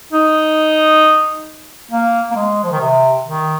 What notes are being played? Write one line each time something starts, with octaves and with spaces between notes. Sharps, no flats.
D#4
A#3
A#3
G#3
F3
D#3
C3
D#3